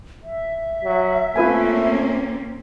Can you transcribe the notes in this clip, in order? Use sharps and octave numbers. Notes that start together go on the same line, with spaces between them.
E5
F#3
A3 A#3 C4 C#4 F4 B4 G#5